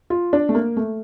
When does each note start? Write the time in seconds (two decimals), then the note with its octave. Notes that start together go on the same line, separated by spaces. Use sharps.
0.10 F4
0.33 D4
0.49 A3
0.55 A#3
0.77 A3